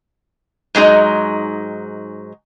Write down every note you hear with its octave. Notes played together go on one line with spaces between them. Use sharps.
G#2 F#3 G#3 D#4